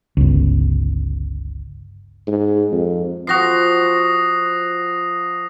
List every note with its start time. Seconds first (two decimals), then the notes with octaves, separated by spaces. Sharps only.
0.17 G1 C#2
2.27 G#2
2.72 F2
3.27 F3 F#4 D#6 A#6 C7